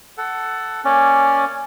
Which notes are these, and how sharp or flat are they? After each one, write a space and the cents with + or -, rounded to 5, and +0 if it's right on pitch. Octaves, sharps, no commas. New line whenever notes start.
A4 +0 F#5 +15
A#3 +0 C#4 +0 D5 +0